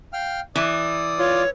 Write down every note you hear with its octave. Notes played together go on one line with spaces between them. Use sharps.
F5 G5 F6
E3 D5 D#6
F4 C#5